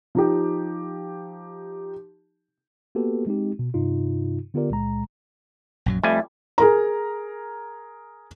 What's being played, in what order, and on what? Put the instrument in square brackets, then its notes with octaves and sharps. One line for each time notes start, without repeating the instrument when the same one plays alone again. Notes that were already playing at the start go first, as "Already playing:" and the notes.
[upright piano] F3 D#4 G4
[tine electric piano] A#3 B3 F#4 G4 A4 B4
G#3 C4 D#4 G4
B2
G2 C3 D#4 F4
D3 B3 F4 G4 A#4 D5
C#2 A#2 G#3 A#5
[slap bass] A#1 F#2 F#3
[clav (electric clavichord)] F2 G3 G#5 [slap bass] A3 [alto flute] E5
[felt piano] G#4 A#4 A#5